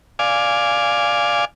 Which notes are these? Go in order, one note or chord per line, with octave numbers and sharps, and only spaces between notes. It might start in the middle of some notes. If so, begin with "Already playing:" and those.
D5 F5 G#5